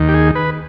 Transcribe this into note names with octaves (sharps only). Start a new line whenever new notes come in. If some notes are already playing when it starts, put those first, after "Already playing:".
Already playing: D#2 D#3
G4
G#4
B4